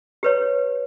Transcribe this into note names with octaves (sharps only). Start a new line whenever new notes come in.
G4 B4 C#5